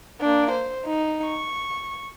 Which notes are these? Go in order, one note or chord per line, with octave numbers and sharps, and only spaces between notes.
A#3 D4
C5
D#4
C#6